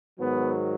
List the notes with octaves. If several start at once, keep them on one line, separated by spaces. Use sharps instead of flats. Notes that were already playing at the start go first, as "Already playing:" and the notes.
G#2 D#3 F#3 B3